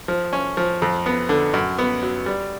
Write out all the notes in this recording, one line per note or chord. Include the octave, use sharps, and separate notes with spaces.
F3
C#4
F3
F2
B3
D3
F#2
B3
F#3
G3